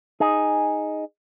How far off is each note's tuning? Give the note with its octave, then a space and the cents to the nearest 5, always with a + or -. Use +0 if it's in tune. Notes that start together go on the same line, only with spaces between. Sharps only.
D#4 +0 G#4 +0